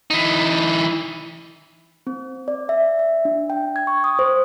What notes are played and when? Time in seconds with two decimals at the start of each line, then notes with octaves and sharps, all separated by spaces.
0.10 E3 D#4
2.07 C4
2.48 D5
2.69 E5
2.99 E5
3.25 D4
3.50 G5
3.76 G#6
3.87 C#6
4.04 D#6
4.19 C5